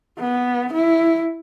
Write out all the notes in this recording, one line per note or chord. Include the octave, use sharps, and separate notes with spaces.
B3
E4